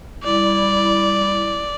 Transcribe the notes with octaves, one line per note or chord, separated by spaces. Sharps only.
G3 E4 D5